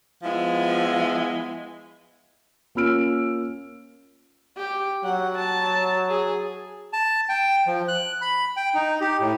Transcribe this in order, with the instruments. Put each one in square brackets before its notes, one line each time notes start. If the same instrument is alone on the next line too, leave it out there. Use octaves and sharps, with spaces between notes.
[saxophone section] F3 G#3 B3 E4
[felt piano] A#3 C#4 F4 E6 F6 D7
[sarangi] G4
[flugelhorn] F#3 [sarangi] F#5
[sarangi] A5
G#4
[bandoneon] A5
G5
F3
F#6
B5
G5
D#4
G4
A2